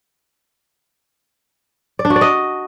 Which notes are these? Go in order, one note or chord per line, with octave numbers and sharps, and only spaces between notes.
D5
D4
F#4
D5
D#5